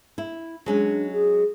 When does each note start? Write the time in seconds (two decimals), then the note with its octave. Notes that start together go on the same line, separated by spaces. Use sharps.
0.18 E4
0.66 F#3 G#3 C#4 D4
1.12 G#4